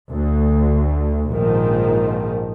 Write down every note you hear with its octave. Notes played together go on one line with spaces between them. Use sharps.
D2
A#1 G#2 D#3 F3